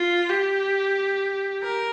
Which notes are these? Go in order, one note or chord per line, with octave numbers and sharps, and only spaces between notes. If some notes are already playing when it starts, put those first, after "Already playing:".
Already playing: F4
G4
A#4